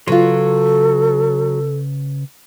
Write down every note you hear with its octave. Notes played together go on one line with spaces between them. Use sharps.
C#3 F#3 F4 A4 B4 C6